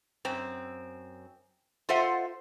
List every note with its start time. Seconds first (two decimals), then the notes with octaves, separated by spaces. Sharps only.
0.25 F#2 C4
1.89 F4 A4 C5 E5 F#5